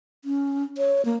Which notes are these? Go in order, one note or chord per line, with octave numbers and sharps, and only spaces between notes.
C#4
C#5
A#3